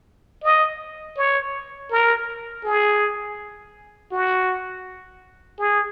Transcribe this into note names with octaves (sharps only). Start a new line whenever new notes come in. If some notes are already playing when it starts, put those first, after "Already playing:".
D#5
C#5
A#4
G#4
F#4
G#4